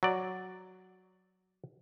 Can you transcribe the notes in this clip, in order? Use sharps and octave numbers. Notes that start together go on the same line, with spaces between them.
F#3 D5